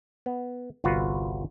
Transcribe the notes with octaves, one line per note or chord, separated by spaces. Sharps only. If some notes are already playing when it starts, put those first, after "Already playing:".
B3
G1 C2 F4 F#4 B4